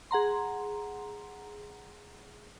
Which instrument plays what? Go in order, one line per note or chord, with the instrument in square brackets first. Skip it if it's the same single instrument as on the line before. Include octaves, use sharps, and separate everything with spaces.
[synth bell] G#4 F#5 A#5 C6